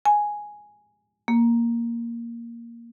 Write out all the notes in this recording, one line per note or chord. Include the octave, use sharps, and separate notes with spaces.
G#5
A#3